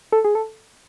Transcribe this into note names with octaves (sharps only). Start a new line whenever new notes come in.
A4
G#4
A4